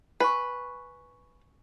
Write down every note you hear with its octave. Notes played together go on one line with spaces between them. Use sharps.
B4 G#5 C#6